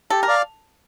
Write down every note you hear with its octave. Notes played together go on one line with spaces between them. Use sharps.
G4 A4
A#4
D5 F5